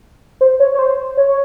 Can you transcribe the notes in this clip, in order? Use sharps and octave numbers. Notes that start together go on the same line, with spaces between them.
C5
C#5
C#5
C5
C#5